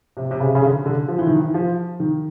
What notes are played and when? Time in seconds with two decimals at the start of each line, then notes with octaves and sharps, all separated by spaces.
0.17 C3
0.31 C3
0.40 C#3
0.55 C#3
0.62 D3
0.86 D3
1.08 F3
1.18 E3
1.27 D#3
1.36 E3
1.54 F3
2.00 D#3